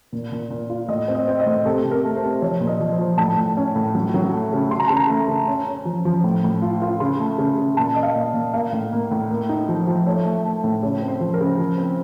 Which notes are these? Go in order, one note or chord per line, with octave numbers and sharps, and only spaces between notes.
A#2
A#2
A#2
F4
A2 D#5
C4
D#5
C4
D#5
A2
C3 A4
C3
A#4
A3
C5
C3
F3 C#5
A#2
D#5
F3
C5
F3
A2 A5
A2
C#4
A2
F#3
F#3
A3
C#3
C#3 C6
A#5
C#3 A5
A#5
A3
C#3
C#4
C#4
F3
F3
A2
A2
F4
F4
C#3 C6
A3
C#3
C#3
A#2 A5
A#2 D#5
F5
A#2
A#2
A#3 F5
A2
A#3
A2
A#3
D#4
F3
F3
A3 C#5
A3
A3
A2
C#3 C#5
C4
C5
F3
A#4
C#3
F3
C4